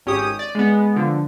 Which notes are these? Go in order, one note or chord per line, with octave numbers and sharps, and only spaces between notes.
G#1 C#4 G4 D#6
D5
G#3 B3
D3 F3